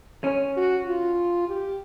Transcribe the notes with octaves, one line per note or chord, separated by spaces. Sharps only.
C#4
F#4
F4
G4